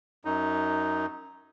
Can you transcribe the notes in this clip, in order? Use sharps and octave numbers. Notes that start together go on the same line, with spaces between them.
F#2 D#4